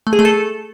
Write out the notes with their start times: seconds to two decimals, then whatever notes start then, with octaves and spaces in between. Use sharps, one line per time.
0.07 A3
0.13 G#4
0.19 A3
0.25 A4